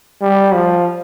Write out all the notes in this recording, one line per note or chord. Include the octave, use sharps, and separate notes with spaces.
G3
F3